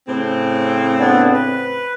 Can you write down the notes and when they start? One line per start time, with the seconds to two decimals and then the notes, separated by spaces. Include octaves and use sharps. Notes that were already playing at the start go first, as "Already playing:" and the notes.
0.07 A2 C#3 C4
0.99 B3 D4
1.33 B4